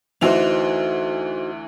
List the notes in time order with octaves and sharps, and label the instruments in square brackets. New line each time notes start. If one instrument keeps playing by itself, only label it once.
[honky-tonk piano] D2 E3 F7 [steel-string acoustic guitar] D#4 F#4 C5